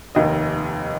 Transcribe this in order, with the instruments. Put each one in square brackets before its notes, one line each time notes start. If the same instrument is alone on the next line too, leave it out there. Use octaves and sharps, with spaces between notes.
[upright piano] F1 D#2 D#3 D#5